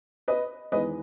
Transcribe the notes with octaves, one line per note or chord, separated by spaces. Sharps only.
B4 D#5
E2 D#3 G#3 B3 B4 D#5